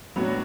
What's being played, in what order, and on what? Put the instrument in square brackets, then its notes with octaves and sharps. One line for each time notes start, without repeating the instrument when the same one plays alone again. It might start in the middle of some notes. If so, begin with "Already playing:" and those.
[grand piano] A2 F#3 B3 D4 F#4